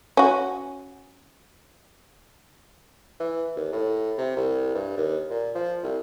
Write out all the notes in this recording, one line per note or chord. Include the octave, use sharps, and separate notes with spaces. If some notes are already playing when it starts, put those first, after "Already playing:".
C#4 F#4
E3
D#2
A2
C3
C2
G2
D#2
A#2
F3
C2